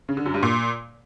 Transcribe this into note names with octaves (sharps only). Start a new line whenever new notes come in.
C#3
D3
F#2
G2
A#2